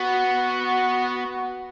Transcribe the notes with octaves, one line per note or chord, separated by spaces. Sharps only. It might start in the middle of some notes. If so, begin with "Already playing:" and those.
Already playing: B3 F#4